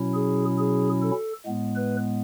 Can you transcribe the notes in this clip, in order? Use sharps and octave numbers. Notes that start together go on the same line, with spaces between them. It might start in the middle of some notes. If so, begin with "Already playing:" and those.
Already playing: B2 F#3 C#4 E4
G#4
G#4
A4
A2 G#3 B3
B4